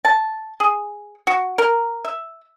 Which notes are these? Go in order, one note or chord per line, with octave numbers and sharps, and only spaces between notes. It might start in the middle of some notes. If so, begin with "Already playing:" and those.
A5
G#4
F#4
A#4
E5